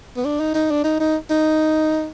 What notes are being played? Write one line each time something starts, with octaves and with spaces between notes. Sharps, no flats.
B3
D4
D#4
D#4
D4
D#4
D#4
D#4